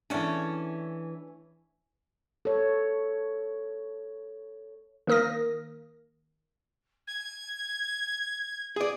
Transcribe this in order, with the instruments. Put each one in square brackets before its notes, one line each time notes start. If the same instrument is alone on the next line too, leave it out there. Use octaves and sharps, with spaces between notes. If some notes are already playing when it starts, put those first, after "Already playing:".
[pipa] C#3 A3 C#4 [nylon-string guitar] E3 D4
[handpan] A4 C#5
[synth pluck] D#3 A#3 A#4 D#6 A#6
[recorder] G#6
[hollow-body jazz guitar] G#4 D5 [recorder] D#6